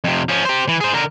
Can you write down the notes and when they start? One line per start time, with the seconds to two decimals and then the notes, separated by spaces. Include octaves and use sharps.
0.04 F2 C3
0.29 F3 C#4
0.45 G4 C5
0.69 E3
0.81 G#4 C5
0.93 D3 A#4